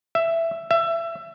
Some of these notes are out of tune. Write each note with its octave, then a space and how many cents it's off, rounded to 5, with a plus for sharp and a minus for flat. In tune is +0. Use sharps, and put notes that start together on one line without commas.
E5 +10
E5 +25